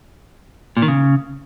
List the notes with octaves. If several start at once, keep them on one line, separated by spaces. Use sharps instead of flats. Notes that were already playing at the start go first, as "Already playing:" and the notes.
A#2
D#3
C#3